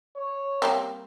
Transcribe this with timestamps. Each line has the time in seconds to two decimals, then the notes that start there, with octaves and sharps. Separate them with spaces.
0.16 C#5
0.62 G3 A#3 C4